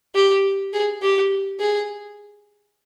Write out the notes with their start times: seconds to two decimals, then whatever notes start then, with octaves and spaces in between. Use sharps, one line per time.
0.15 G4
0.73 G#4
1.02 G4
1.60 G#4